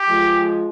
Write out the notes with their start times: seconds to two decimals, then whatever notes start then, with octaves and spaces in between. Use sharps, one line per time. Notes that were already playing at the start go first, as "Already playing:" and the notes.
Already playing: G4
0.09 F3 G#3